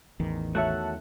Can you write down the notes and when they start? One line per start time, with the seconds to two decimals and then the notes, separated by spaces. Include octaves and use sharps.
0.20 A1 E2 D#3
0.55 A3 F#4 C#5 E5 A5 F#6